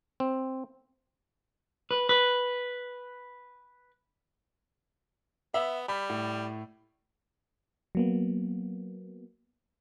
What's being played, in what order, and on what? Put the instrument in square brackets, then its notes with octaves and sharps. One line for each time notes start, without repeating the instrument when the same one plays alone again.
[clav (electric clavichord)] C4
[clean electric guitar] B4
B4
[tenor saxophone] B3 [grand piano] E5
[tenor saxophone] G3 [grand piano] B5
[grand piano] A2
[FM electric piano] F#3 A#3 B3